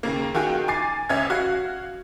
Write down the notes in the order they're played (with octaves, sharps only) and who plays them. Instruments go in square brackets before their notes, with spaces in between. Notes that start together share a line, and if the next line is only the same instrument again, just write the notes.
[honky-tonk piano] D#2 C#3 A#3
D#3 F4 F#4 G#4 G5
G#5 D6 A6 C7
C#2 C#4 E5 G#6
F#4 F5